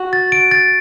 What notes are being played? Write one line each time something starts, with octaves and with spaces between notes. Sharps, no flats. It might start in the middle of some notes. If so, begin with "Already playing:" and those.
Already playing: F#4
A6
D7
A6